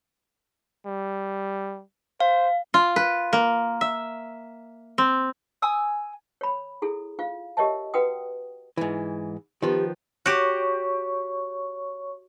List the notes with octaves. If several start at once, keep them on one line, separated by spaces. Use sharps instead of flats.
G3
C5 F5
F4
B4
A#3
E5
C4
G#5 D#6 E6
C#5 B5
E4 G#4 A4
F4 F5
G4 A#4 C#5 D#5 E5 A5
F#4 B4 F#5 G5 D#6
G#2 E3
D#3 F3 B3 G4
F#4 G4 C#5 C#6